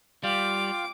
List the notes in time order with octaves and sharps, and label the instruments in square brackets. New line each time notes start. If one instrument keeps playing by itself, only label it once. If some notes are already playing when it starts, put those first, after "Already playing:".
[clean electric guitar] G3 [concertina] F4 F5 G5 [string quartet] D6